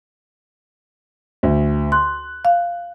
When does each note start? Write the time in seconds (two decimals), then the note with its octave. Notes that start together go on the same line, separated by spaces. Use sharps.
1.43 D2
1.92 C6 F#6
2.45 F5